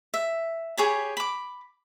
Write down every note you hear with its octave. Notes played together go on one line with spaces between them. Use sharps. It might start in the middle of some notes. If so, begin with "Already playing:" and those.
E5
G4 G#4 C#5 B5
B5 D6